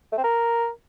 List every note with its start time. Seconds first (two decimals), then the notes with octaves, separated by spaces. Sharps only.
0.12 A3
0.18 C4
0.24 A#4